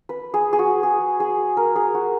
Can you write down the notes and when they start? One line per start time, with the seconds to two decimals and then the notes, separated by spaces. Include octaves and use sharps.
0.09 B4
0.34 G#4
0.53 G#4
0.59 F#4
0.83 G#4
1.20 G#4
1.57 A#4
1.76 G#4
1.95 F#4